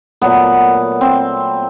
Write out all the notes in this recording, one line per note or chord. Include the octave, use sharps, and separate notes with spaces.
A#2 F#3 A3 B3
C4